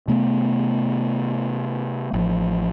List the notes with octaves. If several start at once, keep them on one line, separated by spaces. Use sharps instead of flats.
C3 A3 B3
A1 F3